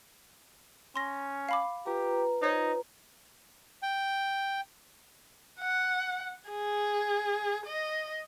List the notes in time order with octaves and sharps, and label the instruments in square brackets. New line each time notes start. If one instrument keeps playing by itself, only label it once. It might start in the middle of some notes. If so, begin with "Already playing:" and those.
[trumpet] C#4 [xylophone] C6 A#6
[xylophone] F5 B5 D6
[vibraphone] F4 B4 A#5 [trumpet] G4
[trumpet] D#4 [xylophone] C5 C#5
[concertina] G5
[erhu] F#5
G#4
D#5